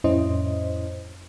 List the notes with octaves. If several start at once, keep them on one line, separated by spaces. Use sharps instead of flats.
F2 A2 C#4 E4 C5 D#5